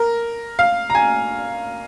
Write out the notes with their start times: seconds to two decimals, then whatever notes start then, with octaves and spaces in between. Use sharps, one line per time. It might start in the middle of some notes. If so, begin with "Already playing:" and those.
Already playing: A#4
0.59 F5
0.90 A#5
0.95 G#5